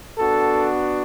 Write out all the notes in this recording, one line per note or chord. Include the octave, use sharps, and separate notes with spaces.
B3 D4 F#4 A4